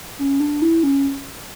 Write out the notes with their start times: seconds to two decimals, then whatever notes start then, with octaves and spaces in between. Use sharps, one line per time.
0.19 C#4
0.40 D4
0.62 E4
0.83 C#4